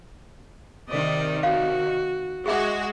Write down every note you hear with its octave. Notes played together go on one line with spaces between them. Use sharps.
C3 D#3 D5 D#5
F#4 C#5 F5
G#3 F#4 G#4 E5 D6